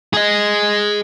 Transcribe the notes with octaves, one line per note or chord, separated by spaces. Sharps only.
G#4 D#5